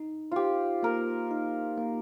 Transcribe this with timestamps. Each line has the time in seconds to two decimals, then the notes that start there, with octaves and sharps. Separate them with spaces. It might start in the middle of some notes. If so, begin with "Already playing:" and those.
Already playing: D#4
0.31 F4 G4 C5
0.83 A#3 A#4
1.31 D#4
1.78 A#3